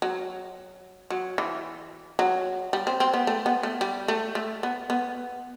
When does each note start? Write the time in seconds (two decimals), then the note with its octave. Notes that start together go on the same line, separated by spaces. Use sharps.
0.02 F#3
1.10 F#3
1.38 E3
2.19 F#3
2.73 G3
2.87 C4
3.00 C4
3.14 B3
3.27 A3
3.46 B3
3.63 A3
3.81 G3
4.08 A3
4.35 A3
4.63 B3
4.90 B3